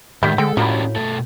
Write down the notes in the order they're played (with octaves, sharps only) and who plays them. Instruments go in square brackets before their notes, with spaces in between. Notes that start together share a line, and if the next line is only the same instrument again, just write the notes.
[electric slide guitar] A2 G#3 [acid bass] D#3 [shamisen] G3 D4 E4 [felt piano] G6 B6
[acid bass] D3 [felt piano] G#3 [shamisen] C4 [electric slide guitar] A4
[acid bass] A2 [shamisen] F3 A#3 [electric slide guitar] C#4 D4 G4 [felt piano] F#4 B5
[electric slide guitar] B2 A3 A4